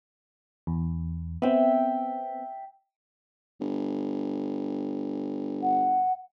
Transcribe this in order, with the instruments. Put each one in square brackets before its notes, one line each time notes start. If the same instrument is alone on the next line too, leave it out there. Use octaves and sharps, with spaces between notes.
[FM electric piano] E2
[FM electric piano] B3 C4 [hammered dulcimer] E5 G5
[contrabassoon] G1
[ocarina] F#5